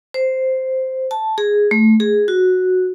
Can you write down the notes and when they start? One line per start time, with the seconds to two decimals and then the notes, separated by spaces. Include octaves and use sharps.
0.14 C5
1.11 A5
1.38 G#4
1.71 A3
2.00 G#4
2.28 F#4